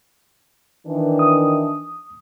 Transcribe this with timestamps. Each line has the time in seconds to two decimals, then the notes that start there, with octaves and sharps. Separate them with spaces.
0.86 D#3 E3 D4
1.19 D#6